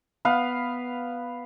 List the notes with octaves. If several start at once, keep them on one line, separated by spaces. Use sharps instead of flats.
B3 B4 F5